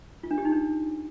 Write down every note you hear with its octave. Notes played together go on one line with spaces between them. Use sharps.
F4
D4
G4
D#4
D4